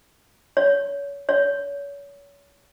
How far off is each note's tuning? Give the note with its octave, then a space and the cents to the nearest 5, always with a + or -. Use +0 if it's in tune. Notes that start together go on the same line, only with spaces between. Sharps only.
C#5 +30
C#5 +35